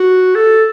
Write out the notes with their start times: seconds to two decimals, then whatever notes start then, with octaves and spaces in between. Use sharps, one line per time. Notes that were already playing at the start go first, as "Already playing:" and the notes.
Already playing: F#4
0.35 A4